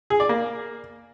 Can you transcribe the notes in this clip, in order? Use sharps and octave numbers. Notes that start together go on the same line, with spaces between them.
G#4
D5
A#3